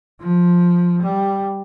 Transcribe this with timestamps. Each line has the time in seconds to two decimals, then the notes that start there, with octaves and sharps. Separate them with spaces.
0.21 F3
1.02 G3